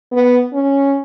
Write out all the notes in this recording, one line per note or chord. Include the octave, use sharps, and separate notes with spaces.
B3
C#4